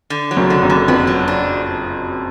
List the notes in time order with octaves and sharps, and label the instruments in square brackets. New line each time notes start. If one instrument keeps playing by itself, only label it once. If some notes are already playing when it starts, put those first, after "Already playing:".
[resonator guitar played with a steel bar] D3
F#3
[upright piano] F#1 F#2
[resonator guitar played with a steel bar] D3
[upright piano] F#1 F#2
[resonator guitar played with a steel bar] D3
[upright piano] F2 [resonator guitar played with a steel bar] B3
[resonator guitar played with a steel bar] F#3
D4